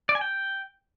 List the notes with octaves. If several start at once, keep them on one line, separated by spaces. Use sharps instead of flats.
D5
G#5
G5